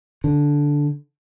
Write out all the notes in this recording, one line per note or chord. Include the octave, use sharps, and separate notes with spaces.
D3